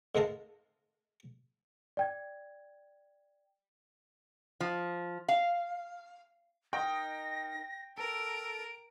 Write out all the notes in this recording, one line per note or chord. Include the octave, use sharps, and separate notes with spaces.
G#2 G#3 A3 A#4 F5 A5
D5 G5 G#6
F3
F5
D#4 A#4 D#5 G5 A#6
A4 A#4 D7